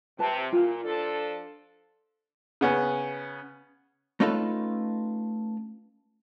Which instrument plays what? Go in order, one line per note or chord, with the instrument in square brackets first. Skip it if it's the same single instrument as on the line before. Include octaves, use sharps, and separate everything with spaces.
[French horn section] C3 [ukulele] B4 A5
[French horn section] A#2 [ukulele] F4
[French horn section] F3 D4 A4
[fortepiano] C#3 B3 C#4
[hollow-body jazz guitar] A3 C#4 D#4 F4 A4 B4